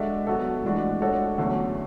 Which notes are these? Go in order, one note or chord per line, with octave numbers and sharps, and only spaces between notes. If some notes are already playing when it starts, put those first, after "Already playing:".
Already playing: G#3 D4 F#4 A4 E5
F#3 B3 F#4 A4
A2 E3 G#3 D4 F#4
G#3 D4 F#4 A4 C#5
E2 D3 F#3 A3 C#4